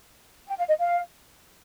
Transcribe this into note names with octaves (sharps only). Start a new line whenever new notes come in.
G5
F5
D#5
F5